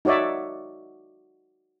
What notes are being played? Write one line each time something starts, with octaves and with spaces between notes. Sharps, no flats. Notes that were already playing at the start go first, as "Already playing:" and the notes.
D#4 F#4 C#5 D5 E5